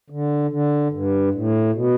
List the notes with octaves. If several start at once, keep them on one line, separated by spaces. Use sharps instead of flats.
D3
D3
G2
A2
B2